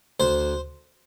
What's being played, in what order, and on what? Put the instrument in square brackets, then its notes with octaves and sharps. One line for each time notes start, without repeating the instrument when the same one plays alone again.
[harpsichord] D2 C5